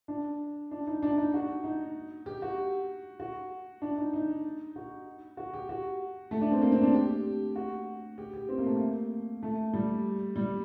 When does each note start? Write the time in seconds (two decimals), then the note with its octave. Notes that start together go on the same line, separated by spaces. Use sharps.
0.08 D4
0.71 D4
0.87 D#4
1.02 D4
1.17 D#4
1.34 F#4
1.64 D#4
2.26 G4
2.42 F#4
3.20 F#4
3.82 D4
3.98 D#4
4.13 D#4
4.76 F#4
5.37 F#4
5.53 G4
5.69 F#4
6.31 A3
6.41 D4
6.52 C4
6.62 A#3
6.72 C4
6.82 D4
6.94 G4
7.56 F#4
8.18 G4
8.33 G4
8.49 C4
8.58 A#3
8.66 A3
8.75 A#3
9.43 A3
9.73 G3
10.36 G3